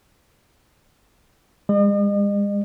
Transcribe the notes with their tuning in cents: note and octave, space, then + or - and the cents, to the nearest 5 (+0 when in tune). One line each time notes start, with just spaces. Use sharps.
G#3 -40 D#5 -45